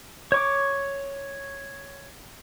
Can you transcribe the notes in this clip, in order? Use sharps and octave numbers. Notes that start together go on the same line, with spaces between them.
C#5 C#6 D6